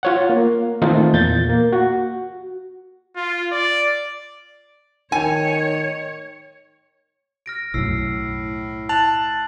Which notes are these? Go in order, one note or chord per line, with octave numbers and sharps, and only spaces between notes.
F4 C#5 F#5
A#3
D#3 E3 A3 C4 D#4 F4
E2 A#2 G6 A6
A#3
F#4
F4
D5
D#3 C#5 G5 G#5
F6 A#6 D7
B1 F#2 A2 E6 C7
A5 F#6 F7 F#7